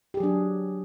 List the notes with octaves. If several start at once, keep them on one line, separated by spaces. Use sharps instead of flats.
F#3 D4 G4 G#4